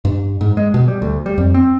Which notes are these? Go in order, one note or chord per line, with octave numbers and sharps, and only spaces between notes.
G2
G#2
G#3
B2
G3
D2
G3
F2
C4